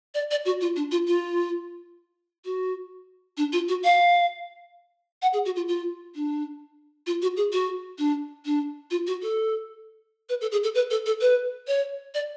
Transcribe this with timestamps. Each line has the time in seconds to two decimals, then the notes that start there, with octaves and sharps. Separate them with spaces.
0.14 D5
0.31 D5
0.45 F#4
0.61 F4
0.76 D4
0.91 F4
1.07 F4
2.45 F#4
3.37 D4
3.52 F4
3.68 F#4
3.84 F5
5.22 F#5
5.33 G#4
5.45 F#4
5.56 F4
5.68 F4
6.15 D4
7.06 F4
7.22 F#4
7.37 G#4
7.52 F#4
7.98 D4
8.45 D4
8.91 F4
9.07 F#4
9.22 A4
10.29 B4
10.41 A4
10.52 G#4
10.63 A4
10.75 B4
10.90 A4
11.06 A4
11.21 B4
11.68 C#5
12.14 D5